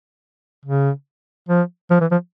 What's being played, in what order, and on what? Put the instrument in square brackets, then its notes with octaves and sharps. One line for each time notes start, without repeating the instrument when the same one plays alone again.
[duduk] C#3
F3
F3
E3
F3